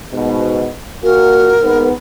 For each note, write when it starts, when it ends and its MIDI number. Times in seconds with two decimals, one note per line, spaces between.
0.13 0.69 44
0.13 0.69 47
1.03 1.54 46
1.03 1.54 66
1.03 1.87 70
1.61 1.91 44
1.61 1.91 59